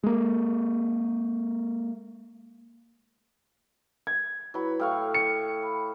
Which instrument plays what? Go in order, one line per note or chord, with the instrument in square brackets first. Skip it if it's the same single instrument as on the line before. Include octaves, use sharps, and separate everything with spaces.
[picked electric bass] G#3 A#3
[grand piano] G#6
[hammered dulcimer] F#3 B5 [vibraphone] E4 B4
[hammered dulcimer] A2 F5 C#6 [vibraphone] G5
[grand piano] C#7
[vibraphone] B5